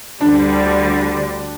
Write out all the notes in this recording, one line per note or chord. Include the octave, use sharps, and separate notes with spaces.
D2 D3 G3 D4